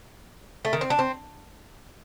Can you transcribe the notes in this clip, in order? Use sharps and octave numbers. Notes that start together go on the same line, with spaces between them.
A3
D#3
C4
D4
C4